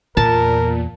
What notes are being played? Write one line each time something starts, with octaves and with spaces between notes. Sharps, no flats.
E2 A#2 A#4 A5